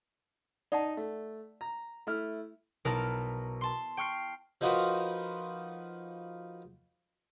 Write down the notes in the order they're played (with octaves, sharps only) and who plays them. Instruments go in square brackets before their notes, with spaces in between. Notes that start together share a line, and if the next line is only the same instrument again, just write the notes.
[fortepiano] D#4 [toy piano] D5 F#5 A5
[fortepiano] A3
A#5
A3 E4 F6
[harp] B1 E4 A#4 A5 A#5 F6
A5 C6
G5 C#6 F6 C7
[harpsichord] F3 D#4 F4 F#4 A#4 B4